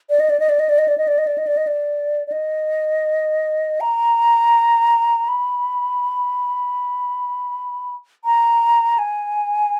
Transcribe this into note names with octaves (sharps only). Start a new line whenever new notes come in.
D5
D#5
D5
D#5
D5
D#5
D5
D#5
D5
D#5
D5
D#5
D5
D#5
D5
D#5
D5
D5
D#5
A#5
B5
A#5
G#5